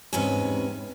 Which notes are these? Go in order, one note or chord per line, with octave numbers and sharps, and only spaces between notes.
E2 G#2 C3 C#4 B4 G#5